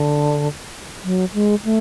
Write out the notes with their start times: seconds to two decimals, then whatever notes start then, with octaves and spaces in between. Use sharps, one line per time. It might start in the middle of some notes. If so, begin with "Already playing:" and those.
Already playing: D3
1.04 F#3
1.34 G#3
1.65 A3